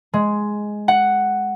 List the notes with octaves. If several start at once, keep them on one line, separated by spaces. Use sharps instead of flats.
G#3
F#5